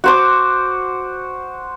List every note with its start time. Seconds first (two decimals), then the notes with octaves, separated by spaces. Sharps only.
0.04 F#4 C5 D6